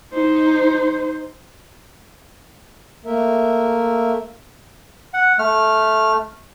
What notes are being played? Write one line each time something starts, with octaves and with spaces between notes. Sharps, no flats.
D#4 C5
A3 A#3 A#4 E5
F#5
A3 F6